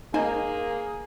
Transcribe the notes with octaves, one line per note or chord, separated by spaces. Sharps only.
A#3 D#4 G#4 C5 G#5